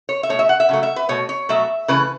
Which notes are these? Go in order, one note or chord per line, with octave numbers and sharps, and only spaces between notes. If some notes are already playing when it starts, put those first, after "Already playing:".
C#5
E5
B2 A3 C#5
E5
F#5
E5
C#3 F#3 A3
E5
B4
B2 A3 C#5
C#5
B2 F#3 A3 E5
C#3 E3 A3 B4